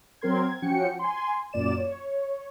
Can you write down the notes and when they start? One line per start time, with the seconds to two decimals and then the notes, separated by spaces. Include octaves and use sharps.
0.21 F#3 C4 A#4 C6 G#6
0.43 G#6
0.62 F3 C#4 F#4 G5 C#7
0.99 G#5 C6
1.53 F#2 A#2 D5 E7
1.78 C#5